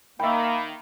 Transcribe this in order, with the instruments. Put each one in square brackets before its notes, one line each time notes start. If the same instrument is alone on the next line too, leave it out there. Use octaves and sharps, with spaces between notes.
[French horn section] D#3 [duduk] A#3 [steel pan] E5 G5 [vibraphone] B5